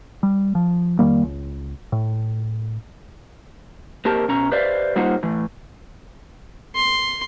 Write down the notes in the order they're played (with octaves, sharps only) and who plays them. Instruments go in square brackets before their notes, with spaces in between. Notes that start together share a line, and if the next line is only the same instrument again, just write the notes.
[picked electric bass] G3
F3
F2 D#3 G3 A#3
C#2
A2
[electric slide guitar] A#3 C4 G4 A#4 A5
B2 C#4 A#5
G4 B4 C5 D5 E5 F5
G3 A#3 D#4 F4 C5 F#5
A2 E3
[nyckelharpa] C6